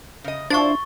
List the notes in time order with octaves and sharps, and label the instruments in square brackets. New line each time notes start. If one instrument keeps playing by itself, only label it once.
[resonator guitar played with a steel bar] C#3 D#5
[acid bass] D4 [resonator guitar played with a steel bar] E4 F4 C5 [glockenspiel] C#6 A6